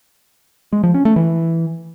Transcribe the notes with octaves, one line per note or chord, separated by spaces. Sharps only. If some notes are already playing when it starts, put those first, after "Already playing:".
G#3
F3
C#4
A3
E3